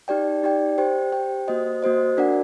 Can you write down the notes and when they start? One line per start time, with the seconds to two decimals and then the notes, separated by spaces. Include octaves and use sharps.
0.08 D#4 G4 D5 G5
0.43 D#4 G4 D5 G5
0.78 G4 C5 G5
1.12 G4 C5 G5
1.48 A#3 F#4 C5 D#5
1.83 A#3 F#4 C5 D#5
2.17 D4 F#4 A#4 D5 F#5